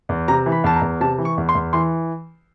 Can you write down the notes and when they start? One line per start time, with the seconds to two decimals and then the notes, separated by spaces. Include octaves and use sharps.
0.09 E2
0.28 C3 A#5
0.46 E3
0.52 B5
0.64 E2 A5
0.76 A#5
0.82 E2
1.00 C3 A5
1.18 E3
1.25 C#6
1.38 E2
1.49 C6
1.55 E2
1.73 E3 C6